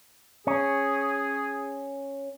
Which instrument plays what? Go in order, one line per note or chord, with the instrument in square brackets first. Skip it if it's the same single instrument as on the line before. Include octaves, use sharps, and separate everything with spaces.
[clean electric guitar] C#4 [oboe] G#4